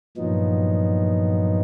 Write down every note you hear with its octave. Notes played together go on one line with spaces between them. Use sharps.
G2 A#2 F3 F#3 B3 D#4